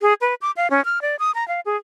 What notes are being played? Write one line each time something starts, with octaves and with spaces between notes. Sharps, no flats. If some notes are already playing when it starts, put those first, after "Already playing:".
G#4
B4
D6
F5
C#4
F6
D5
D#6
A#5
F5
G#4